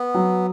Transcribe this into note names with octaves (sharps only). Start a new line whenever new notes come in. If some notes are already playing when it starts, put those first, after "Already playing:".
Already playing: B3
F#3